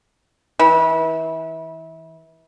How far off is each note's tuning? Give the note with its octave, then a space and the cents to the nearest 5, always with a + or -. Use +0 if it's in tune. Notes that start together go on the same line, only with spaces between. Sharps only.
E3 -30